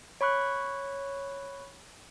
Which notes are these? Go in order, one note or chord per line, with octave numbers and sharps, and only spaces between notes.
C#5 B5 C#6 F#6